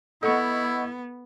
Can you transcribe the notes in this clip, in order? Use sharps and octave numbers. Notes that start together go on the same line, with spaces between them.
B3 E4 A4 D#5 F#5 C#6